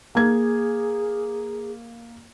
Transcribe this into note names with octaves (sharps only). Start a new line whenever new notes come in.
A#3 G#4 G#6